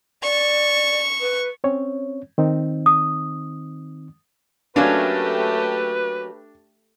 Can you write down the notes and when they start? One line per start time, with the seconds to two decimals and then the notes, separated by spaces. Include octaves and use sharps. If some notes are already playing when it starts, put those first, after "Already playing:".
0.23 D5 C#6
1.21 B4
1.64 C4 C#4 C#5
2.38 D#3 C4 D#4
2.86 D#6
4.76 F#3 A3 A#3 C#4 D4 G4 B4